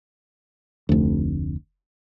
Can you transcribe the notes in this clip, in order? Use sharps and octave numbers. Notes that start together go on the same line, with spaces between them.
F1 D2